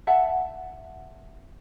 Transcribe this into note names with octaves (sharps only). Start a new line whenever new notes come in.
E5 F#5 A5